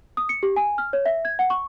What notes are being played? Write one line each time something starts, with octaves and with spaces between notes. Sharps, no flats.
D#6
C#7
G4
G#5
F6
C#5
E5
G#6
F#5
C#6